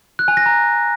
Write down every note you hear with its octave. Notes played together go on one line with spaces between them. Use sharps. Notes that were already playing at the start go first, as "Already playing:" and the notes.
F#6
G#5
A#6
A#5